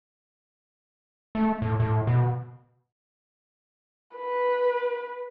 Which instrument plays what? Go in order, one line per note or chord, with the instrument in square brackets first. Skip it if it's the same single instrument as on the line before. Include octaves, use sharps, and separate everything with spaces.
[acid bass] A3
A2
A2
B2
[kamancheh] B4